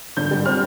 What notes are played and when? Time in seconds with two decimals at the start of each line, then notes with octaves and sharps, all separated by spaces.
0.17 D3 G6
0.31 G3
0.45 C4 F6